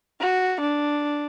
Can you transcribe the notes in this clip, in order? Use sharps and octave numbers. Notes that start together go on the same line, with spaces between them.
F#4
D4